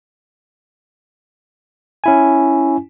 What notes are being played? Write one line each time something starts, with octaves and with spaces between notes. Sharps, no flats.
C#4 E4 G#5